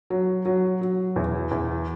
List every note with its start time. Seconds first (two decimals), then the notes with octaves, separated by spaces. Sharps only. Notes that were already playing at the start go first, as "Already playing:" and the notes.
0.10 F#3
0.45 F#3
0.81 F#3
1.16 E2
1.51 E2